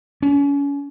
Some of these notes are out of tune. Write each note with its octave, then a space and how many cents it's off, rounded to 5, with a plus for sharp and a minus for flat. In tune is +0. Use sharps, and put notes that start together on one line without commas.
C#4 +35